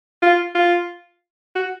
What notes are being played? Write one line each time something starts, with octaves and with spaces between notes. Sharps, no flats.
F4
F4
F#4